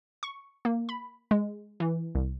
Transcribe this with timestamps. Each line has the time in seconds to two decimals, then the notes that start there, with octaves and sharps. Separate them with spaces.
0.23 C#6
0.65 A#3
0.89 B5
1.31 G#3
1.80 E3
2.15 C2